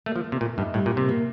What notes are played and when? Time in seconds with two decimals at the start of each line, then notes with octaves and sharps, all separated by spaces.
0.06 A3 A#3
0.16 F3
0.24 A#3
0.32 C3
0.41 A#2 A3
0.57 G2 D#4
0.74 A2 G3
0.86 A#2
0.91 A#3
0.97 C3
1.09 A#3